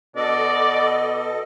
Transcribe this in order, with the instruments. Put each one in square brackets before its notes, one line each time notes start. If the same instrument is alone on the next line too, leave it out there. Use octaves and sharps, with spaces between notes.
[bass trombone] B2 [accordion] A4 D#5 [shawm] D5